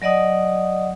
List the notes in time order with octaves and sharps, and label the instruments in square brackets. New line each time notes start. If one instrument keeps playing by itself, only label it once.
[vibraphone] F#3 D5 D#5 F#5 D#6